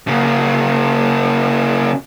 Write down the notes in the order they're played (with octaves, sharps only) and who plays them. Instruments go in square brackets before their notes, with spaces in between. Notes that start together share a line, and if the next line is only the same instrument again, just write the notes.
[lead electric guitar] C#3 A#3